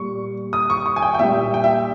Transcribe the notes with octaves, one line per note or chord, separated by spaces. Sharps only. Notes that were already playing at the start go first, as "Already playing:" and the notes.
Already playing: A#2 G3 C#6
D#6
C#6
C#6
G#5
G5
G5
A#2 G3 E5
G5
E5